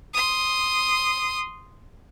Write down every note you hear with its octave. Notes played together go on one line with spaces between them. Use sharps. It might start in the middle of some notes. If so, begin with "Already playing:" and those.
C6 D#6